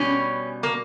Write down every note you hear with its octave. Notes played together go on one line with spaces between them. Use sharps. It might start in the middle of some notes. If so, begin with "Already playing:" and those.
Already playing: B2 G3 C#4
A#3